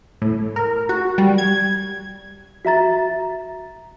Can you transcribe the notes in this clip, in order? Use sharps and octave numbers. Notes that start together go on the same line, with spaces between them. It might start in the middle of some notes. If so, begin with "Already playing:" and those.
A2
A#4
F#4
G3
G#6
F#4 E5 A#5 A6